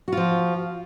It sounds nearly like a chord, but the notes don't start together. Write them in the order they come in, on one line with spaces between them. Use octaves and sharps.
F#4 F4 F3